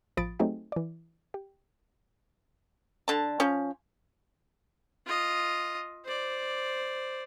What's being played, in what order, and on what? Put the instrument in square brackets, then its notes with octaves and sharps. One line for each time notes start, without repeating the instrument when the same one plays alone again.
[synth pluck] A1 F3 B5 D#6 A6 D7
F#3 A3 C4 D#4 G4 G#4
E3 D5
G4
[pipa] D3 A5
F3 C#4
[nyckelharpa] F4 D#5
C5 D5